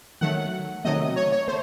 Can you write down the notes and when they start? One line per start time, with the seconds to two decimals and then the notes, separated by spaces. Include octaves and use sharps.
0.21 D#3 F#3 A3 F#5
0.85 C3 D#3 F#3 A3 D#5
1.16 C#5
1.32 C#5
1.48 A3 C5